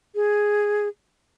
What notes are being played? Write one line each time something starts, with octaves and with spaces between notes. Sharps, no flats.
G#4